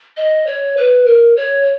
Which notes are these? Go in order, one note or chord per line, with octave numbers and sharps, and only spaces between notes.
D#5
C#5
B4
A#4
C#5